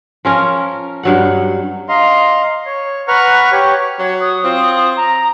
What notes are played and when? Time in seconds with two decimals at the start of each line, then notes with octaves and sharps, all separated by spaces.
0.25 F3 C#4 A#4
1.03 G2 F#3 F#5
1.89 D#5 F5 A#5 C6
2.66 C#5
3.08 B4 F#5 A#5 C#6 F6
3.52 G4 C#5
3.98 F#3 C#5
4.21 D#6
4.44 C4 F4
4.97 A#5